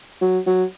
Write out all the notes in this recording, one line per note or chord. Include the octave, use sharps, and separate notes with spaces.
F#3
F#3